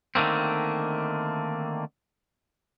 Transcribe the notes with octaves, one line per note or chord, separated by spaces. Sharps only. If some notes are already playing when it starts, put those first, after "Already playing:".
D3 D#3 A3 A#3 C4